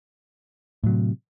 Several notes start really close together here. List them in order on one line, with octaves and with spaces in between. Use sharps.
A2 F#3 C3